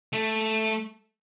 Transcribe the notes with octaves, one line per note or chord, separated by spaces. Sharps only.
A3